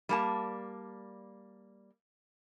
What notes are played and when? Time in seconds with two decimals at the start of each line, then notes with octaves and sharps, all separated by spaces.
0.09 G3 A#3 A5